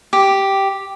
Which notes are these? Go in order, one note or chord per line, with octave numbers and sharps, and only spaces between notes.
G4